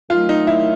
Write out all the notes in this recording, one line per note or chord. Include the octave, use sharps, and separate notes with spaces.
D#3 F#3 A3 F4
D#4
E4